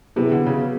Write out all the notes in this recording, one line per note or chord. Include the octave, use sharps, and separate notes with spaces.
C3 F#3 B3 E4 G#4 B4
D3
C#3